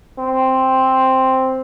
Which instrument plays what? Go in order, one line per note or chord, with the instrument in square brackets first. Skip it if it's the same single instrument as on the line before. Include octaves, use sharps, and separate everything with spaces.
[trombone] C4